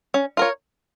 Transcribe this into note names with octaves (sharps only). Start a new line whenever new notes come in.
C#4
F4 A#4 C#5